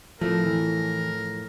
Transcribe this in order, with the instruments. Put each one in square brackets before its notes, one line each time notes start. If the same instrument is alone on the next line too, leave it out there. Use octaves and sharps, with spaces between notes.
[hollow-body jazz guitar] F2 A2 A3 [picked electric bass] F3 [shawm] A#4
[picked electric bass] E3